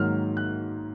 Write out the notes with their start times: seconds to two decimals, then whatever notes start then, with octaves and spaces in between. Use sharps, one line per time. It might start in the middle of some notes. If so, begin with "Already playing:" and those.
Already playing: G#2 D#3 F#3 A#3 F6
0.37 F#6